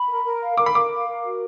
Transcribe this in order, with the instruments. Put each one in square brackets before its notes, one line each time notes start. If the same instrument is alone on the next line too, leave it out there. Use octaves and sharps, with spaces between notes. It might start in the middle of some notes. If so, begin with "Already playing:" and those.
Already playing: [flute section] B5
A#4
A#4
F5
[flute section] A#4 [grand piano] D6
[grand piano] B5
[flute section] A#4 [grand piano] D6
[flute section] F5
A#4
F#4